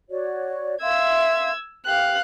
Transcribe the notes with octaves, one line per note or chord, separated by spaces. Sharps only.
F#4 C#5 D5
E5 F5 C6 E6 G#6
G4 F5 G5 F#6